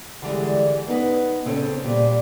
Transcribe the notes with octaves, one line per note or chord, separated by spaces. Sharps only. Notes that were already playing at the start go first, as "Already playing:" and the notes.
D3 E3 G3 G#3
B3 D#4 B4
C#3 C4 C#4 A4
A#2 G3